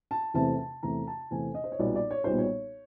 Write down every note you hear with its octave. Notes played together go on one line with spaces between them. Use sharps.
A5
E2 C3 E3 A3 C4 A5
A5
E2 C3 E3 A3 C4 A#5
A5
E2 C3 E3 A3 C4 G#5
D#5
C5
C#5
B1 A#2 G3 B3 D5
D5
C#5
B1 A#2 G3 B3 C5
C#5